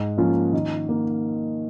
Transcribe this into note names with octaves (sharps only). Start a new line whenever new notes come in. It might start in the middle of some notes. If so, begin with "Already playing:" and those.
Already playing: G#2
F3 A#3 C#4 F4
D#3
A#3